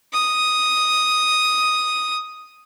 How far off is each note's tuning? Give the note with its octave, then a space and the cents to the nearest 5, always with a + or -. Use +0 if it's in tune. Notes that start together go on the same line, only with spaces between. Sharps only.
D#6 +0